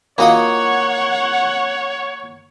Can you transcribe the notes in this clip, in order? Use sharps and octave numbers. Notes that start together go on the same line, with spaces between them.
E3 F#3 A#3 F4 C#5 D#5 F#5 D#6